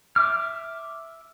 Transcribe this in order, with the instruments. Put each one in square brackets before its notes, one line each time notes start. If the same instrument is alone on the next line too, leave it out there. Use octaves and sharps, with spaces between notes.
[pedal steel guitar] E5 D6 F6